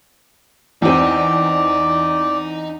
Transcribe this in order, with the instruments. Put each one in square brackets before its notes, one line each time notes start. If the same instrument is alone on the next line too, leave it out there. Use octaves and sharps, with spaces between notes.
[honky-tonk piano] E2 C4 [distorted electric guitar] D#4 [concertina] D5